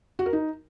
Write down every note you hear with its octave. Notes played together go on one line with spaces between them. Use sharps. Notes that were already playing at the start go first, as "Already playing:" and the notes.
F#4
A#4
D#4